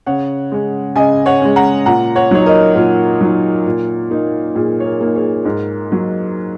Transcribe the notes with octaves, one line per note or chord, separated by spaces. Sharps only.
C#3 C#5 F#5
G#3 C#4
C#3 D#5 G#5
C#5 F#5
G#3 C#4
F#5 A#5
A#2 F#5 A#5
C#5 F#5
F#3 D#4 C#5
A#4 D#5
A#2 A#4
F#3 D#4
A#2
A#3 D#4
A#2 G#4
C#5
A#4
A#3 D#4
G#4 C#5
G#2 A#4
F#3 A#3 D#4